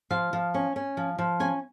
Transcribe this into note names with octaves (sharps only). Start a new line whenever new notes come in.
F3 F5
F3
C#4
C#4
F3
F3
C#4 G#5